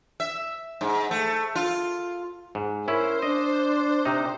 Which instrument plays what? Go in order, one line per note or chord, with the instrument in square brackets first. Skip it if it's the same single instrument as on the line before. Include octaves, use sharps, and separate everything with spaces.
[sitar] E5
G#2
A3
F4
[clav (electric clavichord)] G#2
[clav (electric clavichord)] C#4 E4 [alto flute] A#4 [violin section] C5
[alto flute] D4 [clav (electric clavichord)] D#5
[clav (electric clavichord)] C3 D#4